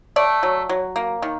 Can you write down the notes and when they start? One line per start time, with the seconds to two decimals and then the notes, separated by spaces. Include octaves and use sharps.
0.16 A3 D5
0.43 F#3
0.69 F#3
0.96 A#3
1.22 D#3